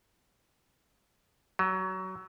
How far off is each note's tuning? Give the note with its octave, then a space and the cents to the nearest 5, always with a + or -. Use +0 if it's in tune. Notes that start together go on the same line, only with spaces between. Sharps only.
F#3 +20